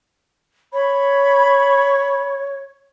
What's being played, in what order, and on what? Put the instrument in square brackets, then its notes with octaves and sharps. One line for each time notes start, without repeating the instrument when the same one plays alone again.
[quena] C#5 [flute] B5